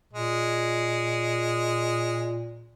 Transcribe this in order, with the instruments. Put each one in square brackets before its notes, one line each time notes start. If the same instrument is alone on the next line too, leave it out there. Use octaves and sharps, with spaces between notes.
[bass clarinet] A#2 [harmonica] G#3